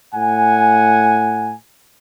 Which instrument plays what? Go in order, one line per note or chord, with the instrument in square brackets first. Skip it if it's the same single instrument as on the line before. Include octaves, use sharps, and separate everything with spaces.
[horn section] A2 F#5 G#5